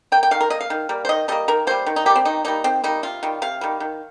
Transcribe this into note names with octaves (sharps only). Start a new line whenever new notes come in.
A#3 G5
G5
D#3 F5
A#4
A#3 D#5
F5
D#3
G3 A#3
C5
D#3 D#5
G3 A#3 D#5
D#3 A#4
G3 A#3 C5
D#3
D#4
G3 A#3 G4
C4
D#3 D#4
G3 A#3 D#4
D#3 C4
G3 A#3 D#4
C3 F4
D#3 G3
C3 F5
D#3 G3
D#3